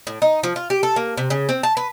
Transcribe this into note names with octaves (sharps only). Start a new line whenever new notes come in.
A2
D#4
F3
F4
G4
A4
A#3
C3
C#3
C4
A5
B4